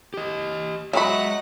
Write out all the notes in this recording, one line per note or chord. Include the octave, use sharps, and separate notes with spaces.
G4 D#5
F#3 G#3 G#4 D#5 E5 F#5 B5 C#6